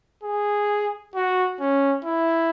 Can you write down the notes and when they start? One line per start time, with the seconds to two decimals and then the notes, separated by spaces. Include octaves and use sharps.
0.23 G#4
1.15 F#4
1.60 C#4
2.05 E4